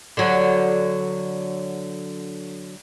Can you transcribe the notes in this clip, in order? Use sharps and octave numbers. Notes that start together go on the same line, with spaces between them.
D3 F#3